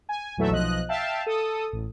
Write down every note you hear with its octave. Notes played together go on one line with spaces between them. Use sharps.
G#5
A#1 E2 F#3 A3 A4 E5
B1 F3 D#5 F#6
E5 F5 G5 A5
A4 D#6
A1